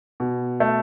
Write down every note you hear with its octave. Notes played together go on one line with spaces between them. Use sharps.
B2
A3